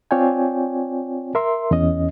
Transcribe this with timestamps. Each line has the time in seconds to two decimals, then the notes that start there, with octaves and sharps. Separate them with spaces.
0.11 C4 F4 C#5 D5 G5 G#5
1.35 A#4 E5 C6
1.71 E2 C#4 D#5